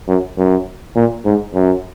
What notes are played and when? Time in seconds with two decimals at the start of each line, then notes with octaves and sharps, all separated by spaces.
0.08 F#2
0.38 F#2
0.96 A#2
1.25 G#2
1.54 F#2